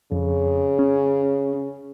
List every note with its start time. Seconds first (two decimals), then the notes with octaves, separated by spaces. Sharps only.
0.12 F2 C#3
0.79 C#4